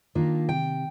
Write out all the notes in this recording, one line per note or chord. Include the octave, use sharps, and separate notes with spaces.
D#3 A#3 D4 F4
C3 G5